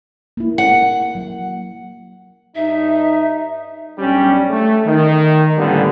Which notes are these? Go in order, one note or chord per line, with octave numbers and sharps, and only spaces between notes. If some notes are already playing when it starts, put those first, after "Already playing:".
A#3 E4
F#5
F#3
G2 D#4 E5
B1 G3 C#4 D4 G4
A3
D#3
A2 D3 G3 A#3 B3 C#4